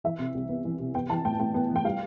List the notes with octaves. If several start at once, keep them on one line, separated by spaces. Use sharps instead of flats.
E3 E5
C3
C2
B3
E3
C3
B3 G5
E3 A5
A2 G5
A2 G5
B3
E3
G5
G3 F5